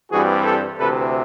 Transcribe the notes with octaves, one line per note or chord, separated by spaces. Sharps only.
G2 E3 G3 C4 F#4 G#4
G4 A4
D2 C3 E3 A4 B4